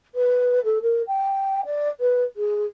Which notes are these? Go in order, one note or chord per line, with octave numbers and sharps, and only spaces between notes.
B4
A4
A#4
G5
D5
B4
G#4